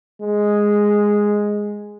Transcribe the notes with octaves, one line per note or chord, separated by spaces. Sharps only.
G#3